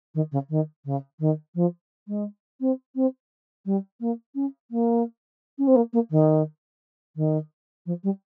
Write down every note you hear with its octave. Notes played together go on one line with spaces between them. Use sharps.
D#3
C#3
D#3
C#3
D#3
F3
G#3
C4
C4
G3
A#3
C#4
A#3
C#4
C4
A#3
A#3
D#3
D#3
F3
G3